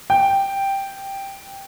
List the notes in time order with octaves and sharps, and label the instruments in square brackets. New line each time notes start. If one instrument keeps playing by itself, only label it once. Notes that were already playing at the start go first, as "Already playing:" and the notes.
[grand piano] G5